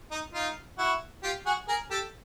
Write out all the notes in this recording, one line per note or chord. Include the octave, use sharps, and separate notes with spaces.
D#4
D#4 F4
E4 F#4
F4 G4
F#4 G#4
G#4 A#4
G4 A4